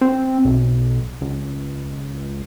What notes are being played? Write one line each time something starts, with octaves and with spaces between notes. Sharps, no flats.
C4
B1
C#2